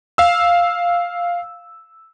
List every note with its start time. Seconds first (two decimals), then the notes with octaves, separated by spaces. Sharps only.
0.18 F5 E6